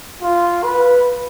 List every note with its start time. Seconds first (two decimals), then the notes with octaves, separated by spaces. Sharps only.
0.22 F4
0.64 B4